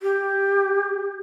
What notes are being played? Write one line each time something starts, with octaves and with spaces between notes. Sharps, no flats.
G4